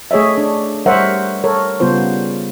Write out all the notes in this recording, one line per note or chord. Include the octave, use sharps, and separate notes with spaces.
A3 G#4 C#5 D#5 E5
D4
G3 A#4 C5 C#5 E5 F#5
A4 A#4 C#5
C#3 G3 B3 F4 C5